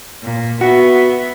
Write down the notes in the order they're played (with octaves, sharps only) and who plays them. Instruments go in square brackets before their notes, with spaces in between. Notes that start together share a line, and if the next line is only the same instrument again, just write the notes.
[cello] A#2
[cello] B3 E5 [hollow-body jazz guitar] F#4